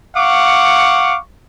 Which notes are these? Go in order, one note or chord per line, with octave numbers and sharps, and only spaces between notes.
F5 F#5 C#6 D6